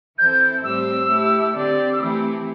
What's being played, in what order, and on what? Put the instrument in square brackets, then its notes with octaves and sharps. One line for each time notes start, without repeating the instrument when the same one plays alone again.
[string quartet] E3 C4 E4 A4 C5 [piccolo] G6
[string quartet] A2 G3 C4 G4 C5 [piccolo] E6
[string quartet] A3 E4 G4
D3 C4 G4 D5
[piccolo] E6
[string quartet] E3 A3 C4 E4 G4 [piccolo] D6